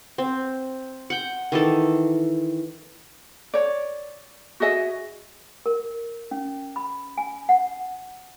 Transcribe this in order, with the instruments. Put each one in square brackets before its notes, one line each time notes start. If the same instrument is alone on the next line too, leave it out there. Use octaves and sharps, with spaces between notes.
[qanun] C4
F#5 G5
D#3 E3 A4
[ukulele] C#5 D5
F#4 G#4 D#5 E5
[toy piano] A#4
C#4
B5
G#5
F#5